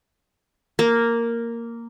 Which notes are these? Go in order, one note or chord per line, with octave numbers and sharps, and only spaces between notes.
A#3